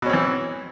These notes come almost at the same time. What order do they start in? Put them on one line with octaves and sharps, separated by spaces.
B2 C#4 C4 E3